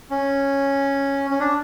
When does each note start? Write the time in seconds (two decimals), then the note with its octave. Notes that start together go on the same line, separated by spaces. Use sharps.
0.10 C#4
1.30 C#4
1.40 D4